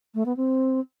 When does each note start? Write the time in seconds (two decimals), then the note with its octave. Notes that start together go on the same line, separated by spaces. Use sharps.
0.15 A3
0.26 B3
0.37 C4